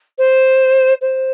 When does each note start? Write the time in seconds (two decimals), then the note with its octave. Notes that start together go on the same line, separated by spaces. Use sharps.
0.18 C5
1.01 C5